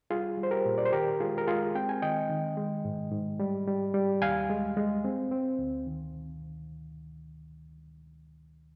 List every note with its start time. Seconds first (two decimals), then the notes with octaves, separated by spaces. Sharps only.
0.10 G3 F4 G#4
0.38 G3
0.43 C5
0.51 G4 A#4
0.65 A#2
0.78 D5
0.85 C5
0.93 D#3 G4 A#4
1.20 G#3 F4 G#4
1.38 A#4
1.47 G#3 F4 G#4
1.75 C4 G5
1.89 G#5
2.02 D#3 D#5 G5
2.30 D#3
2.57 G#3
2.85 G#2
3.12 G#2
3.40 G3
3.67 G3
3.94 G3
4.22 D#2 F5 G#5
4.50 G#3
4.77 G#3
5.04 C4
5.31 C4
5.59 D2
5.86 D#3